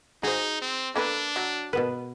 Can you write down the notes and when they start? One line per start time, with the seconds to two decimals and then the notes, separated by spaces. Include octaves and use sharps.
0.23 D#4 F#4 G#4 C5
0.62 C4
0.96 A#3 D4 A4 B4
1.36 F#3
1.73 B2 B3 B4